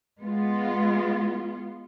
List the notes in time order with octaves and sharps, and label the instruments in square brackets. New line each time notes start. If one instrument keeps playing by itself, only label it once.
[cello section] G#3 B3 F4